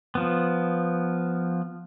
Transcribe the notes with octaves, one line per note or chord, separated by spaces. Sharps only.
F3 B3